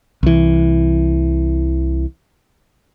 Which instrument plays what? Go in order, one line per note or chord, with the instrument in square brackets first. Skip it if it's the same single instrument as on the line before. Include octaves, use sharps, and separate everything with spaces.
[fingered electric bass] C2 E3